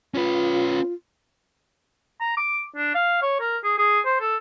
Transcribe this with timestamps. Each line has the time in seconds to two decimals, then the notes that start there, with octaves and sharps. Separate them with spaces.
0.15 C#4 F4 B4
2.20 A#5
2.37 D6
2.76 D4
2.94 F5
3.22 C#5
3.40 A#4
3.64 G#4
3.78 G#4
4.05 C5
4.20 A4